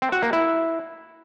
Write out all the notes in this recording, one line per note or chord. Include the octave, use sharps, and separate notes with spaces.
C4
F#4
A#3
E4